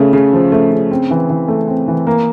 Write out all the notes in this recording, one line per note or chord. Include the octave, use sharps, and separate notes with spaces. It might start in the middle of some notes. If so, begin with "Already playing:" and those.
Already playing: C#3 A3
C#3
F3
A3
C#3
C4
E3
E3
A3
C4
E3
A#3